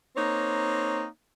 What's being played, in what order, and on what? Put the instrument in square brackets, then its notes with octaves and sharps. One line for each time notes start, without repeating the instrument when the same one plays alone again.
[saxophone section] A#3 C4 D#4 C#5